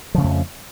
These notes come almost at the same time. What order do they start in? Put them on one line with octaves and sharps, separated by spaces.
F3 C#3 A3 F2